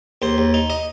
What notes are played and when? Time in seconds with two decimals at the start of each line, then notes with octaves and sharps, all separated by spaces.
0.22 D#2 C5
0.38 D#2
0.54 D#4
0.70 D#5